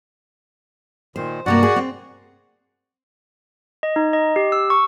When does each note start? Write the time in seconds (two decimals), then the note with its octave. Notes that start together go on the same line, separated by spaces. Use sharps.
1.16 A#2 D#3 C5
1.46 G2 C3 A#3 F#4 D5 F#5
1.63 G#4
1.76 C4
3.83 D#5
3.96 D#4
4.13 D#5
4.36 G4
4.52 E6
4.70 C#6